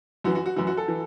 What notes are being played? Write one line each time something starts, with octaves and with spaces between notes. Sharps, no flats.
F#2 E3 F#4
F#4
F#4
F#2 E3 F#4
F#4
A4
E3